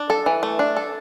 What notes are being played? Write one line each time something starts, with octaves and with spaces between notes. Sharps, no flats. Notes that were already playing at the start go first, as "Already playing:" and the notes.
Already playing: D4
A4
E3
A3
D4
A4